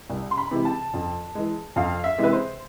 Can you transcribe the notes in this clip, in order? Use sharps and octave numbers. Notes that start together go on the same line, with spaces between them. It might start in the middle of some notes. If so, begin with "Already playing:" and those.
C2
C6
B5
C3 E3 G#3
A5
F2
E3 G#3
F2 F5
E5
C3 E3 G#3
B4
C5